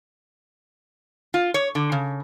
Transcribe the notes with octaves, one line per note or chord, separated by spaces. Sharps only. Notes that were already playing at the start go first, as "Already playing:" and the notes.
F4
C#5
D3
C#3